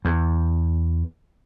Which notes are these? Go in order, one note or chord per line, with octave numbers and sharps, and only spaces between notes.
E2